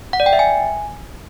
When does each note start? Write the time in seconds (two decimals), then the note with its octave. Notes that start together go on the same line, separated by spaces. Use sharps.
0.13 F#5
0.20 D5
0.26 G5
0.33 E5
0.39 G#5